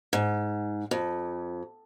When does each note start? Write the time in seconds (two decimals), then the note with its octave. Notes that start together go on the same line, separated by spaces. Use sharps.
0.13 G#2
0.91 F2